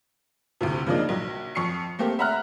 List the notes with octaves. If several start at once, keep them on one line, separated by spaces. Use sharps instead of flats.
D2 A2 C3
C#3 F3 A#3 D4 D#4
A#1 F#3
F2 C#6 C7 C#7
A3 A#3 C4 G4
E5 F#5 A#5 F6 F#6